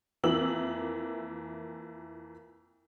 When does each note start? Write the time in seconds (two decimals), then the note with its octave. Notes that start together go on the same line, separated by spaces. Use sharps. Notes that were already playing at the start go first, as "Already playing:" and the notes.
0.23 F2 E3 A#3 E6 F#7